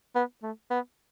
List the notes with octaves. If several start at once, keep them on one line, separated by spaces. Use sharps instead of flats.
B3
A3
B3